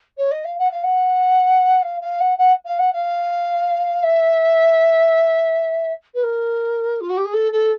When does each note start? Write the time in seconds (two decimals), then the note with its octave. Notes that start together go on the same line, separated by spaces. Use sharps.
0.18 C#5
0.31 D#5
0.45 F5
0.59 F#5
0.71 F5
0.83 F#5
1.83 F5
2.01 F5
2.20 F#5
2.38 F#5
2.65 F5
2.79 F#5
2.93 F5
4.03 E5
6.14 B4
6.23 A#4
7.01 F4
7.09 F#4
7.17 G4
7.25 G#4
7.34 A4
7.52 A4